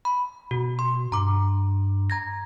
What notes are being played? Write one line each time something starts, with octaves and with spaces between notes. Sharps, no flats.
B5
B2 F#4
C6
G2 A#5 D6
A#5 G#6 A#6